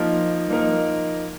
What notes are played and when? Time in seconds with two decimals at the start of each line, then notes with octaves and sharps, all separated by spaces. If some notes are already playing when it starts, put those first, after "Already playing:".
Already playing: F3 A#3 D#4 A#4
0.48 F3 A#3 D#4 A#4